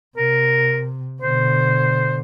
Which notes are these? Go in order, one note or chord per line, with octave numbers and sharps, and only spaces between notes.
C3 A#4
B2 D3 C5